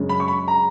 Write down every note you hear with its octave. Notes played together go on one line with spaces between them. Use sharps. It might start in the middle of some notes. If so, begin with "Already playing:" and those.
Already playing: F#2 C#3 G#3
B5
C#6
B5
A#5